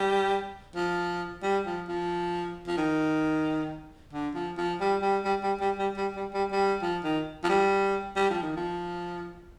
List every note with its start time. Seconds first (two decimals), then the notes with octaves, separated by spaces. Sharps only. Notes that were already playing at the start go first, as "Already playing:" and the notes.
Already playing: G3
0.76 F3
1.43 G3
1.66 F3
1.88 F3
2.67 F3
2.77 D#3
4.13 D3
4.35 F3
4.57 F3
4.80 G3
5.02 G3
5.25 G3
5.43 G3
5.60 G3
5.79 G3
5.97 G3
6.16 G3
6.34 G3
6.52 G3
6.82 F3
7.04 D#3
7.44 F3
7.49 G3
8.16 G3
8.30 F3
8.43 D#3
8.56 F3